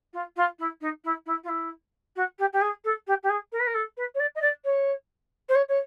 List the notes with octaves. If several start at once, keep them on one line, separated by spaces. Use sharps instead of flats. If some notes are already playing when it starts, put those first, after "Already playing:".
F4
F4
E4
D#4
E4
E4
F4
E4
F#4
G4
G4
G#4
A4
G4
G4
G#4
A#4
B4
A#4
A4
B4
C#5
D5
D#5
D5
C#5
C5
C#5
C#5